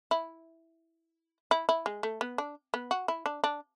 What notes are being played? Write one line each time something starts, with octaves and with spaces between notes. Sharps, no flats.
E4
E4
E4
G#3
A3
B3
D4
B3
F#4
E4
D4
D4